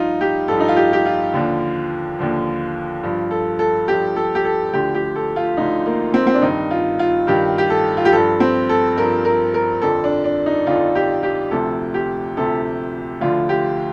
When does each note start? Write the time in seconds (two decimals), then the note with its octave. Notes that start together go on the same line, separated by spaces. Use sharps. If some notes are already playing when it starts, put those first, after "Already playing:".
Already playing: G2 F3 D#4 F4
0.21 G4
0.48 G2 F3 A4
0.60 D#4
0.68 F4
0.76 G4
0.93 G4
1.06 F4
1.33 D#2 D3 F3
2.19 D#2 D3 F3
3.03 G2 F3
3.31 A4
3.59 A4
3.88 G2 F3 G4
4.16 A4
4.35 G4
4.45 A4
4.73 D2 D3 F3 G4
4.95 G4
5.16 A4
5.36 F4
5.57 D2 D3 F3 D#4
5.86 A#3
6.14 C4
6.27 C4
6.34 D4
6.42 G2 D#3 D#4
6.71 F4
6.99 F4
7.27 G2 D#3 G4
7.58 G4
7.70 A4
7.97 F4
8.05 G4
8.12 G2 F3 A4
8.40 C4
8.69 A4
8.97 G2 F3 A#4
9.25 A#4
9.54 A#4
9.82 F2 D3 F3 A4
10.04 D4
10.24 D4
10.46 D#4
10.67 F2 D3 F3 F4
10.95 G4
11.23 G4
11.51 D2 C3 F3 A4
11.94 G4
12.37 D2 C3 F3 A4
13.21 D2 D3 F3 F4
13.49 G4